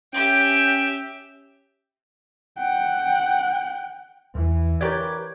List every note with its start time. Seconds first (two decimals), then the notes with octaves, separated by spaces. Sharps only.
0.14 C#4 G4 E5 G5
2.58 F#5 G5
4.35 E2 E3
4.81 G4 A#4 B4 C#5 D5 G#6